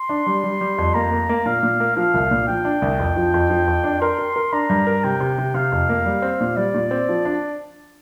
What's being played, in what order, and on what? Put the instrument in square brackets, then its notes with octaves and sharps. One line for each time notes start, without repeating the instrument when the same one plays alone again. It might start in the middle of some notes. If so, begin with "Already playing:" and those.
Already playing: [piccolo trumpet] C6
[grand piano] D4
G3
G3
G3
F2
[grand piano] A#3 [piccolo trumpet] A#5
[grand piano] A#3
A#3
[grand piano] A#2 [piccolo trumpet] F5
[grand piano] A#2
A#3
[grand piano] F3 [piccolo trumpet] F5
[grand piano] C2
A#2
[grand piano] F3 [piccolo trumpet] G5
[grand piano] D4
C2
F2
F3
F2
F3
F2
D4
[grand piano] A#4 [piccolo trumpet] C6
[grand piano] A#4
A#4
[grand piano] D4 [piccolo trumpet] A#5
[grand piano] G2
A#4
[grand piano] C3 [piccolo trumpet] G5
[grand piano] C3
C3
[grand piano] C3 [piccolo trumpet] F5
[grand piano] F2
A#3
G3
C4
A#2
[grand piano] G3 [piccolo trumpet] D5
[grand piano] A#2
C4
F3
D4